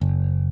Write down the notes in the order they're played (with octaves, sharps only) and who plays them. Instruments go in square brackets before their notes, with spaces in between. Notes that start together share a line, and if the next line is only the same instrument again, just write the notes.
[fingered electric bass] F#1